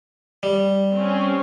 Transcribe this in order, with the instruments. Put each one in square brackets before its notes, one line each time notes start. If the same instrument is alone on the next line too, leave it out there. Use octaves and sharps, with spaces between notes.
[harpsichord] G3
[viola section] C4 C#4